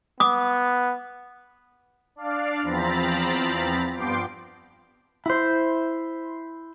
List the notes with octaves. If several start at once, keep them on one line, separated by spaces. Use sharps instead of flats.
B3 D6 D#6
D4 D5 F5
E2 F3 C4 A#5 B5 A6
G2 F3 B3 G5 C6 D6
E4 C5